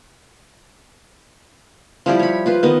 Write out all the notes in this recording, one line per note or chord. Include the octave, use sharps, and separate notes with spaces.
F3 G3 E4 G4
C#5 B5
F4 B4 C5
D#3 B3 D#5